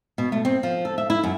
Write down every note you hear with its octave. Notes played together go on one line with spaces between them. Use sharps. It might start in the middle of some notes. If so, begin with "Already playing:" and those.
B2
A3
C4
F3
A4
E5
E4
F#2